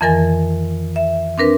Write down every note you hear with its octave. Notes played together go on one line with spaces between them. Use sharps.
F2 D#3 E3 A#4 G#5 A6
E5
C4 D4 A#4 B4